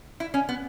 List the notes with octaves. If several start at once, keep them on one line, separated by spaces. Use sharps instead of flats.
E4
C#4
B3